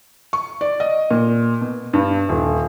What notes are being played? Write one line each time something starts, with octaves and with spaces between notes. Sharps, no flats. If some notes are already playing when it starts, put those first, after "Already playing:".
C#6
D5
D#5
A#2
B2
G2
D#1